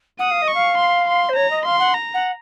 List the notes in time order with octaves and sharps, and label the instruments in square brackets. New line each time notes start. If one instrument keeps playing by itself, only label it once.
[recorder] F#5 [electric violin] D#6
[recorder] F5
D#5
[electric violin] C#6
[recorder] F5
[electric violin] C6
C6
[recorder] C5
[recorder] C#5 [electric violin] A#5
[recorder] D#5
[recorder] F5 [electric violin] C6
[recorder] F#5
[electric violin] A#5
[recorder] F#5